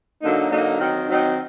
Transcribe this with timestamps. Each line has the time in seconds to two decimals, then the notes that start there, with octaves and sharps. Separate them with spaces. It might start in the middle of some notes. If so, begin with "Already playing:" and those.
0.21 D3 F#3 A#3 D#4
0.50 D3 F#3 A#3 D#4
0.79 D#3 F#3 C4 D#4
1.10 D#3 F#3 C4 D#4